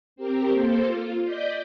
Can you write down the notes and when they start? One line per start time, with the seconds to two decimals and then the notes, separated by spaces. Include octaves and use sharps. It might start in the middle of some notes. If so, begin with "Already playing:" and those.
0.16 C4 G4 A#4
0.52 A#3 A4 C5
0.86 F4
1.24 D5 D#5 G6 B6